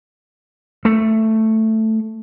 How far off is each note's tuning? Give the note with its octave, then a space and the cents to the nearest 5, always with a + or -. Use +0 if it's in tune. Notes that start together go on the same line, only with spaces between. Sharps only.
A3 +5